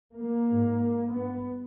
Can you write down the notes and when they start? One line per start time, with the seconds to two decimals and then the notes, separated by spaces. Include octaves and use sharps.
0.14 A#3
0.48 G#2
1.12 G2 B3